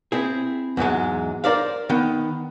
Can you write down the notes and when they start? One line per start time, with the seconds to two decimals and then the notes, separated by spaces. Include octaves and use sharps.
0.12 C4 E4 G#4
0.77 E2 G#2 F#3 G#3
1.44 A#4 C5 D5 F5
1.89 D#3 B3